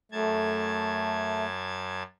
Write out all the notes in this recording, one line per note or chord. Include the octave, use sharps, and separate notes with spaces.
F#2 A3 A5 G#6